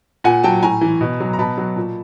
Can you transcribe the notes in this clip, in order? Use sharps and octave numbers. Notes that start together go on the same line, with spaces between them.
A#2 F#5 G#5
F#3 G5 A5
A2 G#5 A#5
E3
B2
F#3
A#5
B2 A5 B5
F#3
A#2